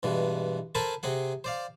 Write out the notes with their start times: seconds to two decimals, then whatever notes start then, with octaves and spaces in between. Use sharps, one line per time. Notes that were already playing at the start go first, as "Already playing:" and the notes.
0.03 G2 B2 E3 G#3
0.75 A4 A#4 C5 G#5 A5 B5
1.03 C3 C4 G#4 F#5
1.44 C5 D5 F5